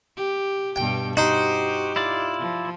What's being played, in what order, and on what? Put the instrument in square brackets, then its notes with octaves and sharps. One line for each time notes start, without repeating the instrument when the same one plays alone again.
[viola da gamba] G4
[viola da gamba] G2 B2 G4 [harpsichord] G5
[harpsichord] D#4 [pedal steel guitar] F#4 C5 [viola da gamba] G4
[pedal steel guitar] E4 F4 D5
[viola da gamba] F3